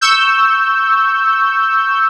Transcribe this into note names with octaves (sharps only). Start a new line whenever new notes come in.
C#6 E6 G6